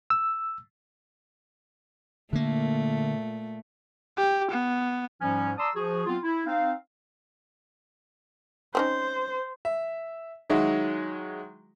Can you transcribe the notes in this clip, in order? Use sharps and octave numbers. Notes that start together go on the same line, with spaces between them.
E6
A#2 D3 A3 A#3
G4
B3
G#2 F3 G3 C#4
D5 A5 A#5 C6 D#6 E6
F3 F#4 G#4
F#3 B3 C4 F4
E4
C4 D#4 F5
C4 C#4 D#4 C5
E5
D#3 F#3 G#3 D#4 E4 F#4